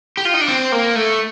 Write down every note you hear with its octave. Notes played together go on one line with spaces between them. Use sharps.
G4
F4
D#4
D4
C4
A#3
A3